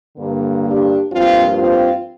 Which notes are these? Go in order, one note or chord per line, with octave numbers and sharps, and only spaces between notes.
G2 D3 A#3
D4 G4
G2 F3 A#3 C4 F4
C4 F4